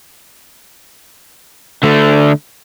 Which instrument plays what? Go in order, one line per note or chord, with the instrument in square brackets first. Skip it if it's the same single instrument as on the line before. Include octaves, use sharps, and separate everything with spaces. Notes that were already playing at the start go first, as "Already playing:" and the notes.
[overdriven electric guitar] D3 A3